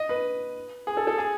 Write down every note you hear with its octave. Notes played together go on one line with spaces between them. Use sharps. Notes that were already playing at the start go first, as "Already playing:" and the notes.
Already playing: D#5
B4
G#4
A4
A4
G#4